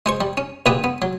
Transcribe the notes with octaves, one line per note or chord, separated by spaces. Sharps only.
G#3 C5 C#6
G3
C#4
A#1 D3 G4 B4 D#6
B3
F#3